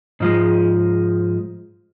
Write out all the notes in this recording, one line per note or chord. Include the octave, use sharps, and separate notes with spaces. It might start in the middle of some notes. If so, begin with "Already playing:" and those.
G#2 F3 G#3